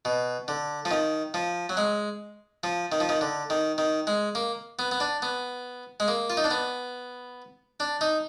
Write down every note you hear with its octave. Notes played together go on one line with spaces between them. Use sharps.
B2
D3
F3
D#3
F3
F#3
G#3
F3
D#3
F3
D#3
D3
D#3
D#3
G#3
A#3
B3
B3
D4
B3
G#3
A#3
F4
D#4
D4
B3
D4
D#4